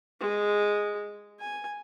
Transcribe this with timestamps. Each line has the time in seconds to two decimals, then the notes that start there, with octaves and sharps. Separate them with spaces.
0.20 G#3
1.40 G#5